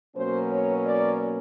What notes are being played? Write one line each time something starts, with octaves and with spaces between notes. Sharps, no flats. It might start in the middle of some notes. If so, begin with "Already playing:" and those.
B2 F#3 A#3 C#4 C5
C#5
D5